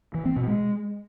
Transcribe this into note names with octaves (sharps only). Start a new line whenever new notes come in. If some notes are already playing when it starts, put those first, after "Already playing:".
E3
C4
B2
G#3